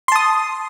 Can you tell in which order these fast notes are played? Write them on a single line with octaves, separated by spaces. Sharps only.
C6 A5 D#6